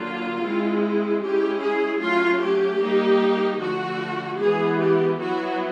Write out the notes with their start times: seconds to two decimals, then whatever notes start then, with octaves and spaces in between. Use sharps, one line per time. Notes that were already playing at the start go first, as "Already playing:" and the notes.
Already playing: D3 F#3 A#3 F4
0.42 G#3 C4 E4
1.22 G#3 C#4 E4 G4
1.62 G#4
2.01 F#3 A3 C#4 F4
2.41 G4
2.80 G3 A#3 D#4
3.60 D3 F3 A3 F#4
4.39 E3 G#3 B3 G#4
4.79 G4
5.19 F#3 B3 E4 F#4